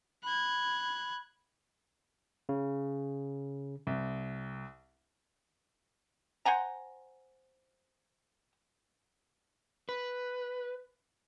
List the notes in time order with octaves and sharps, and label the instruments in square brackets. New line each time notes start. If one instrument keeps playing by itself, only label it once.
[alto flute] B5 [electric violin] F#6 G#6
[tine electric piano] C#3
[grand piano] C2
[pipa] C5 F#5 G#5 A#5
[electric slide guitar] B4